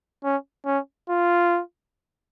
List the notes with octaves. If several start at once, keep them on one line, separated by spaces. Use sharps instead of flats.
C#4
C#4
F4